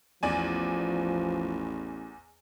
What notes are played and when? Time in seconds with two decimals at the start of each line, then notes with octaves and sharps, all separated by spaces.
0.23 A1 E2 F3 D5 G#5